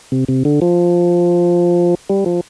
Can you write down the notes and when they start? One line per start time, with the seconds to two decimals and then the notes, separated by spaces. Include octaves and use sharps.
0.12 C3
0.28 C3
0.45 D3
0.62 F3
2.10 G3
2.26 F3